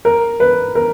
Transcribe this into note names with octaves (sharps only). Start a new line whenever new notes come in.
A#4
B4
A#4